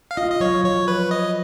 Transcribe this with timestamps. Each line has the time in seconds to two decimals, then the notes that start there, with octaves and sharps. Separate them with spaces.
0.11 F5
0.17 F4 D#5
0.31 D#5
0.40 F#3 C#5
0.64 F3 C#5
0.88 B4
1.11 D#5